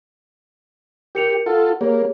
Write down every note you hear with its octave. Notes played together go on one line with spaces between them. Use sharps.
G4 A#4 C#7 F7
F4 A4 F#5
A#3 G4 G#4 C#5